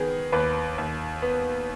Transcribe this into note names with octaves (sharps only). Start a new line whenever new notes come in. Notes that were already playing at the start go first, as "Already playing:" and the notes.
Already playing: D#3 B3 G#4
D#2 B4
D#2
B3